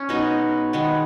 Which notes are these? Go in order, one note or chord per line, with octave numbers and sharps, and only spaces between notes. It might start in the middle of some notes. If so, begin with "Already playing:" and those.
Already playing: C#4
B2 G#3 B3 D#4 F#4
D#3 G#3 B3